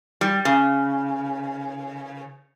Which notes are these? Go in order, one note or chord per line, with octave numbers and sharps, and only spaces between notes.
G3
C#3